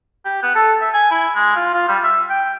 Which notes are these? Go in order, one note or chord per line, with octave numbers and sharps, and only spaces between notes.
G4
B3
A4
E5
G#5
E4
G#3
F4
F4
G3
E5
G5